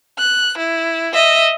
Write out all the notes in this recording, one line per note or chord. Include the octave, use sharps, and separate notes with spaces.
F#6
E4
D#5 E5